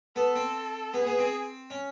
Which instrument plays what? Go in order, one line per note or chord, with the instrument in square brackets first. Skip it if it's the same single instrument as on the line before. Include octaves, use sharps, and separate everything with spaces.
[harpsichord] B3 [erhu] A4
[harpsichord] C4
[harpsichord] B3 [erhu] G#4
[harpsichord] B3
C4
C#4